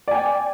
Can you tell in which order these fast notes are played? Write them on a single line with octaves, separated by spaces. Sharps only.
D5 G#5 G5